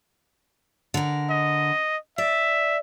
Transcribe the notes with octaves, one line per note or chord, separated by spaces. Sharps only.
D3 A#4
D#5
D5 E5